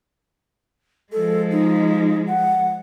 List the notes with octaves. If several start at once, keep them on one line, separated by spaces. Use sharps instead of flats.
F3 G#3 A4
D#4
F#5